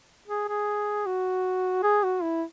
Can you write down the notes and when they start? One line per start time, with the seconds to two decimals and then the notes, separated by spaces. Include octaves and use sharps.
0.27 G#4
0.48 G#4
1.06 F#4
1.83 G#4
2.03 F#4
2.22 E4